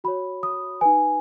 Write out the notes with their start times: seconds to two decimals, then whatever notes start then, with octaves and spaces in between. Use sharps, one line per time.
0.04 F#4 C#5 B5
0.43 D#6
0.81 D#4 B4 G#5